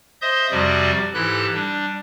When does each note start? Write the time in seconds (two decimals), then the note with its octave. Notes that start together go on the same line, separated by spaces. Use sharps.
0.22 C5 D#5 E5 C6 D#6 G6
0.51 F2 C3 F3 G3 F#4 D5
1.14 G#2 E3 E4 G4 A4 F#6
1.54 G3 D4